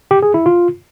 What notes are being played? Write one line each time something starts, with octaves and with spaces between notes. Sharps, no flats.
G4
G#4
E4
F4